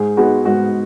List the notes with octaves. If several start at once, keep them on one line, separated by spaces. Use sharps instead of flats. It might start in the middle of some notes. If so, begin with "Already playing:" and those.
Already playing: G#2 G#4
G#3 B3 F#4
G#2 F#4